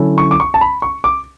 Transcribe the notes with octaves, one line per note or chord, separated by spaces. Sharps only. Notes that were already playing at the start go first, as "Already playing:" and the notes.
Already playing: D3 F#3 C#4 E4 A4
C#6
D6
C#6
A5
B5
C#6
D6